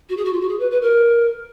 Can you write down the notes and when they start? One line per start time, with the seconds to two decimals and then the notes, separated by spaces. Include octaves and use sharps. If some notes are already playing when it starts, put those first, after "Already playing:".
0.09 F#4
0.17 G#4
0.25 F#4
0.33 F4
0.41 F#4
0.49 G#4
0.60 B4
0.71 B4
0.82 A#4